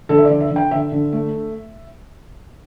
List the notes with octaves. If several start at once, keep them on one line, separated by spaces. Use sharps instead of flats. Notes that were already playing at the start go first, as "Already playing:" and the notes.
D3 A4
E5
D5
D3
E5
D3
G5
D3 E5
D3
A3